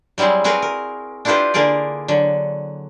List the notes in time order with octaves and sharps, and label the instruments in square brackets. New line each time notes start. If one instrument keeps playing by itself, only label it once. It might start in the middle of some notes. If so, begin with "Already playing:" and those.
[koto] F#3 G3 C4 E4 G#4
C4 F#4 G#4 A#4 B4
A#4
D4 E4 F4 G4 B4 C5
D3 A#3 G#4 A#4 D5
D3 F#3